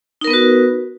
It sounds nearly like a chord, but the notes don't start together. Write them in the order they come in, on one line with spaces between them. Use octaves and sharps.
D#4 A#4 B3 B4 F#4